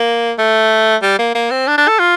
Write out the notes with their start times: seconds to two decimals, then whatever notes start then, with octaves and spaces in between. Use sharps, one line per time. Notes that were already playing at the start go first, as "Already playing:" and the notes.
Already playing: A#3
0.38 A3
1.02 G3
1.19 A#3
1.35 A#3
1.51 C4
1.67 D4
1.78 D4
1.88 A4
1.99 F4